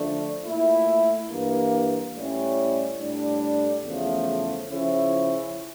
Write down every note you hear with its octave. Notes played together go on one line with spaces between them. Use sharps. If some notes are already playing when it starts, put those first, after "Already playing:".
Already playing: D3 F3 A3 D4
A#2 A3 E4
G2 E3 A#3
A2 G3 C#4 E4
A2 G3 D4
E2 C#3 F3 A3
C#3 F3 C#4 E4